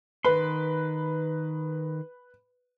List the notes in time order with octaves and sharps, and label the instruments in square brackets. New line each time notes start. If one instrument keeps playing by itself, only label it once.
[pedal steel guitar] D#3 C6 [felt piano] B4